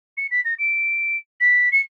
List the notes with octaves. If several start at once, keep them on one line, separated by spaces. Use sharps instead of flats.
C#7
B6
A#6
D7
B6
C#7